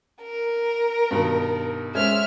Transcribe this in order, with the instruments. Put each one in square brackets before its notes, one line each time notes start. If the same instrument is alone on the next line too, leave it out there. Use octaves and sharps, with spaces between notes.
[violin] A#4
[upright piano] G2 B2 D#3
[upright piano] G#3 C#4 C5 [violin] E5 F6